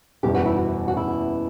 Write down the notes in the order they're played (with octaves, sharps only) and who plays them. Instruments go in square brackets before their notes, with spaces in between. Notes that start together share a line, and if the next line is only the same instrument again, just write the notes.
[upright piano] F#1 E2 B2 G3 B3 [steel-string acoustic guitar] G4
[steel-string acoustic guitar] F#4
E4
F#4
F#4
E4